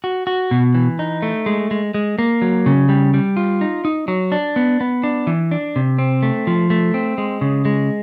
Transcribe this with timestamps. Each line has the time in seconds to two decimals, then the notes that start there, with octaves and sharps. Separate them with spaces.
0.04 F#4
0.27 F#4
0.51 B2
0.75 E3
0.99 D#4
1.22 A3
1.46 G#3
1.71 G#3
1.94 G#3
2.19 A#3
2.42 F#3
2.66 C#3
2.89 G3
3.14 G3
3.37 F4
3.61 D#4
3.85 D#4
4.08 F#3
4.32 D4
4.56 B3
4.81 B3
5.03 D4
5.27 E3
5.51 D4
5.76 C3
5.98 C4
6.23 A3
6.47 F3
6.70 A3
6.94 C4
7.18 G#3
7.41 C#3
7.65 G#3